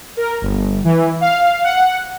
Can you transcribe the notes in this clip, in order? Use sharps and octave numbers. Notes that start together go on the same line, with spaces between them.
A#4
G1
E3
F5
F#5